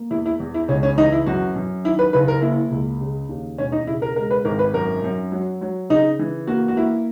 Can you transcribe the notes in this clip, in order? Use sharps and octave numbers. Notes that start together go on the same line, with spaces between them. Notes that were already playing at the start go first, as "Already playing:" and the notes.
Already playing: A#3
E2 E4
E4
E2
E4
C#2 C#4
C#4
E3 D#4
E4
F#2 F#4
F#2
D#3 E4
B4
F#1 B4
A#4
A#3 E4
C#2
C#3
D#2
E1 C#4
D#4
C#3 E4
A#4
G#3 A#4
B4
G#1 A#4
B4
F#2 A#4
F#2
F#3
F#3
C#3 D#4
E3
A#3 F#4
F#4
A#3 E4